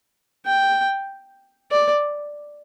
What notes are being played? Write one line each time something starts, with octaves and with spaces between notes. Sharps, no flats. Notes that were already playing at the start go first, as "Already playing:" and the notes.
G5
D5